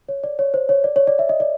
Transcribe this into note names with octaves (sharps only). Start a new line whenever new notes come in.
C#5
D5
C#5
C5
C#5
D5
C#5
D5
E5
D#5
D5